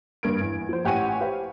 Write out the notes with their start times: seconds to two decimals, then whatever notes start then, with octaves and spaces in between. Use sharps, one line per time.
0.23 F#1 G2 A#3 G#6 D7
0.41 E2
0.69 F3 C5
0.85 A1 G4 F#5 G#5 C#6 D#7
1.20 G4 B4 C5 F5